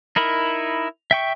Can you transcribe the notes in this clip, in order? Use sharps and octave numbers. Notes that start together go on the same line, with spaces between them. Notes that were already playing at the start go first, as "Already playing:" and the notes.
D#4 E4 A#4 B5
E5 G5 C#6